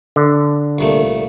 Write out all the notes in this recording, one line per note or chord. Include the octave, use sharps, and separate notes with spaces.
D3
C2 A#2 A3